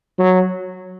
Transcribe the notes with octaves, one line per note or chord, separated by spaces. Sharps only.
F#3